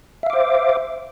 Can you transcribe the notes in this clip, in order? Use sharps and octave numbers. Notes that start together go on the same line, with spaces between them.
C5 E5 F5 D6